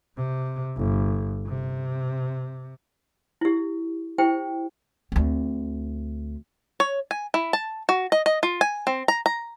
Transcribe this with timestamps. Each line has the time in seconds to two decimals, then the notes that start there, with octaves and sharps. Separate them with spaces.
0.16 C3
0.76 G1
1.46 C3
3.41 E4 G4
4.18 E4 G4 C5 G5
5.12 D2 C4
6.80 C#5
7.11 G#5
7.34 E4
7.53 A5
7.89 F#4
8.12 D#5
8.26 D#5
8.43 F4
8.61 G#5
8.87 C4
9.08 A#5
9.26 A#5